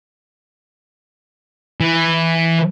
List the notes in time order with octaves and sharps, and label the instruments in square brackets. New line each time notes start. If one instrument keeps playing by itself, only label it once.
[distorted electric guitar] E3